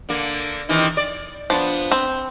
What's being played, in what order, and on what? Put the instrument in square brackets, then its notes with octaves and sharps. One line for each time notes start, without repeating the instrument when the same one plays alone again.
[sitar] D3 A#3
C3 D#3 E3
D5
[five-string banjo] F3 [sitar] B3 D4
[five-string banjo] C4